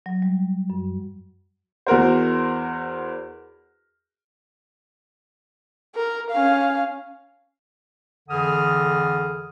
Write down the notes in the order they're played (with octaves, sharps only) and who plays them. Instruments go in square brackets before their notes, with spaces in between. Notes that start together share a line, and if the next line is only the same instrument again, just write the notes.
[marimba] F#3
G3
F#2
[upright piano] E2 F#4 A#4 C5
[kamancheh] A#4
C#4 F5
[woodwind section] F2 D3 E3 G#4 D#6 F6